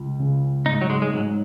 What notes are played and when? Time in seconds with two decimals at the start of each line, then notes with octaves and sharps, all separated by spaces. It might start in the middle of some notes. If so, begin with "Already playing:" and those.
Already playing: C#2
0.19 C#3
0.66 G#2 D#4
0.82 F#3
0.90 G#3
1.02 G#3
1.13 G#2 F#3